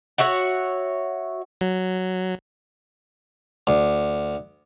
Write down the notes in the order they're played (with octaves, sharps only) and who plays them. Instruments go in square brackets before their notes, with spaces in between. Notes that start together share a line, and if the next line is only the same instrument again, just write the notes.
[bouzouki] F#4 C#5 E5 F#5
[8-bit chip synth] F#3
[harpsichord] D2